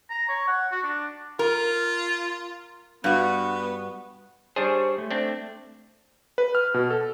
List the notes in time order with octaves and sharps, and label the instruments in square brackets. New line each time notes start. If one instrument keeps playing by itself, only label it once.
[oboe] A#5
C#5
F#5
F#4
D4
[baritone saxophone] F4 [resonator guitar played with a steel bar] A#4
[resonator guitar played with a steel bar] G2 F#4 [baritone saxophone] B3
[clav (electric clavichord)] G3 D4 G#4 [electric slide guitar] C5 C#5
[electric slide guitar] A3
[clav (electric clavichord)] C4 D4
[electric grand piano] B4
F6
B2
A4